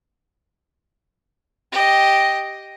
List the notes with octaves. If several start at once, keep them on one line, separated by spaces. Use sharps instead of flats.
G4 D#5